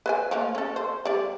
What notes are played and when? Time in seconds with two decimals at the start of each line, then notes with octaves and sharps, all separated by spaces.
0.06 B4 C5 G#5
0.31 F3 A3 A#3
0.55 C#4 A4
0.76 C5
1.05 G3 D5